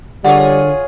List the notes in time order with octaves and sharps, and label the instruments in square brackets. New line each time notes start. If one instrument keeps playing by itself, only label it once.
[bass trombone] D3 [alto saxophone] G3 [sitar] F4 G#4 C#5 [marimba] F#5